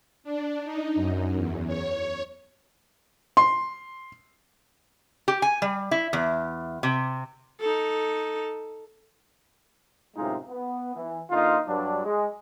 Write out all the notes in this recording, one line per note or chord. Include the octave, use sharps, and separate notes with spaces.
D4
D#4
F#2
E2
C#5
C6
G4
G#5
G3
E4
E2
C3
D#4 A4
F#2 A2 C3 G#3 D#4 F4
B3
E3
D3 A#3 D#4 F4
G2 F#3 D4
G#3